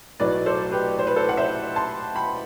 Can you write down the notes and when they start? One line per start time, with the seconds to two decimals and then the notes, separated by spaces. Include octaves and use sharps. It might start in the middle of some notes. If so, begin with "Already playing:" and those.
0.20 B1 A2 F#3 A3 B4 D5
0.46 A4 C5
0.72 G4 B4
0.99 C5
1.07 B4
1.16 A4 C5
1.29 F#5
1.37 C5 E5
1.76 A5 C6
2.15 G5 B5